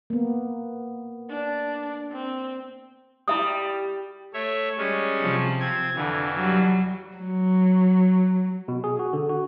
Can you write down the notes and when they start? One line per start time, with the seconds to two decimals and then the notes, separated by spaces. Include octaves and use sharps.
0.10 A#3 B3
1.30 D4
2.12 C4
3.28 G3 E4 E5 D#6
4.34 A3 C#5 E5
4.78 G3 G#3 C#4
5.21 C3 F3
5.60 C4 G#6
5.95 F2 D3 E3
6.35 F#3 G3
7.17 F#3
8.68 B2
8.84 G#4
8.99 F#4
9.13 D3
9.29 F#4